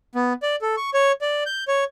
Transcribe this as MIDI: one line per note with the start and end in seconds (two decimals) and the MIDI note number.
0.15 0.33 59
0.43 0.56 74
0.62 0.75 69
0.77 0.90 85
0.94 1.12 73
1.21 1.44 74
1.46 1.64 91
1.68 1.84 73